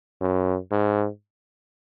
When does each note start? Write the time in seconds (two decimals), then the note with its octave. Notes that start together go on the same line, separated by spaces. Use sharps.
0.21 F#2
0.71 G#2